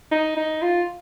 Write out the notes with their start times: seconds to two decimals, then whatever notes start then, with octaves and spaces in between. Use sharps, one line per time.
0.11 D#4
0.37 D#4
0.62 F4